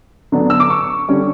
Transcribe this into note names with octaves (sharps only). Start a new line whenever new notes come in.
D3 F#3 B3 D4
E6
D6
C#6
D3 G3 C#4